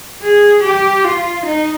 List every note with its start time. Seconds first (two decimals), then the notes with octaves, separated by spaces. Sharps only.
0.22 G#4
0.63 G4
1.04 F4
1.46 D#4